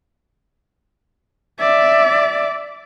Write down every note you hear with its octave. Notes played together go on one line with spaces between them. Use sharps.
D5 E5